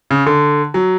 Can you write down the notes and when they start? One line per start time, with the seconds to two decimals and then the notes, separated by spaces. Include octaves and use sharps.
0.11 C#3
0.26 D3
0.74 F#3